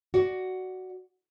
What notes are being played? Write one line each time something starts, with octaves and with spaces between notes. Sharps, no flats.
F#4 D5